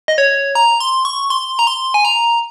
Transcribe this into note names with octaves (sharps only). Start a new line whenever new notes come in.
D#5
C#5
A#5
C6
C#6
C6
A#5
C6
G#5
A#5